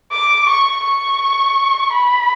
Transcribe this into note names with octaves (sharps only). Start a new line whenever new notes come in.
D6
C#6
C#6
B5